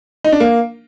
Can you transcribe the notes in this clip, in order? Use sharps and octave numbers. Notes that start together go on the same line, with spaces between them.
D#4
D4
A#3